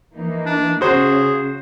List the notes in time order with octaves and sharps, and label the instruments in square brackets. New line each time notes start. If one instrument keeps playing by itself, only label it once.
[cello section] E3 A#3 D#4
[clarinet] D4
[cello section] C#3 [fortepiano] F#4 C5 [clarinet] G#4